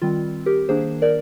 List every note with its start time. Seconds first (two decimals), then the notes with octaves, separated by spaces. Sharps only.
0.02 D#3 G3 C4 F4
0.46 G4 A#4
0.69 D#3 A#3 D4 G#4 C5
1.02 A#4 D5